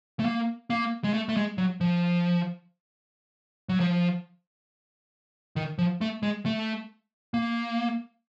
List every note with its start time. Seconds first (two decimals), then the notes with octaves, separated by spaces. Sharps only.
0.20 A3
0.25 A#3
0.70 A#3
1.04 G#3
1.14 A3
1.29 A3
1.37 G#3
1.58 F#3
1.81 F3
3.69 F#3
3.80 F3
5.56 D#3
5.78 F3
6.01 A3
6.23 G#3
6.46 A3
7.34 A#3